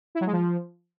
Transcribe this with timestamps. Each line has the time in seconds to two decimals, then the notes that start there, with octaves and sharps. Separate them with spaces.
0.15 E4
0.21 F#3
0.27 G#3
0.33 F3